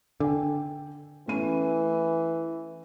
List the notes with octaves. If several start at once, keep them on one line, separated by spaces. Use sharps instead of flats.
D3 G5 G#5
E3 A3 C#4 D#7